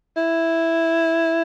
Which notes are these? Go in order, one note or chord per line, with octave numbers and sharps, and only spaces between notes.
E4